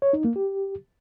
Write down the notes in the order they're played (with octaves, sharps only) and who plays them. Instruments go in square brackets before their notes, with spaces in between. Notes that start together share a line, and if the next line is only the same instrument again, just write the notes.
[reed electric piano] C#5
D#4
A#3
G4